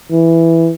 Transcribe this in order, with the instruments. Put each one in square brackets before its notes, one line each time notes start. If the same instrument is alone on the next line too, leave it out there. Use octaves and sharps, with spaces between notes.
[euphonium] E3